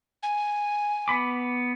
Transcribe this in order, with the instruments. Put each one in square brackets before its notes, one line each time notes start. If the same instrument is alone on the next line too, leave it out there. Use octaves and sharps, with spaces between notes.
[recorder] G#5
[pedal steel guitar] B3 B5 D6